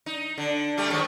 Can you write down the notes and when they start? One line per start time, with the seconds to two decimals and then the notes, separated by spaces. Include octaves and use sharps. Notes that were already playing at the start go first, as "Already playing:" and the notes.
0.06 D#4
0.38 D3
0.77 G3 A3 G4
0.90 G#2 D#3 F#3